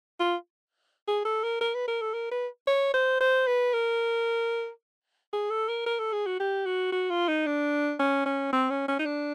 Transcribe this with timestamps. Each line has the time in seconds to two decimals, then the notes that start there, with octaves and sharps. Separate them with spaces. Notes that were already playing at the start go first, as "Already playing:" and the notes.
0.20 F4
1.08 G#4
1.25 A4
1.44 A#4
1.61 A#4
1.74 B4
1.88 A#4
2.02 A4
2.14 A#4
2.31 B4
2.67 C#5
2.94 C5
3.21 C5
3.47 B4
3.73 A#4
5.33 G#4
5.50 A4
5.69 A#4
5.86 A#4
5.99 A4
6.13 G#4
6.26 F#4
6.40 G4
6.65 F#4
6.92 F#4
7.10 F4
7.28 D#4
7.46 D4
7.99 C#4
8.26 C#4
8.53 C4
8.70 C#4
8.88 C#4
8.99 D#4
9.05 D4